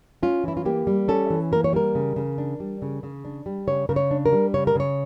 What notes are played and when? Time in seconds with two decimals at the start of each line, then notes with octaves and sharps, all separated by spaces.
0.23 C#4 F4
0.44 E3 E4
0.57 F4
0.65 A#3 G4
0.87 G3
1.08 C#4 A4
1.30 E3
1.52 A#3 A#4
1.64 C#5
1.73 G3 A#4
1.95 C#3
2.16 C#3
2.38 D4
2.60 G3
2.82 C#3
3.03 C#3
3.25 D4
3.46 G3
3.67 C#3 C#5
3.89 C#3 A#4
3.96 C#5
4.11 D4
4.26 A#4
4.32 G3
4.54 C#3 C#5
4.67 A#4
4.76 C#3 C#5